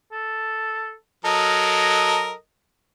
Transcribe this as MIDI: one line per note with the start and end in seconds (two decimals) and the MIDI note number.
0.12 0.93 69
1.25 2.33 54
1.25 2.33 69
1.25 2.33 70
1.25 2.34 75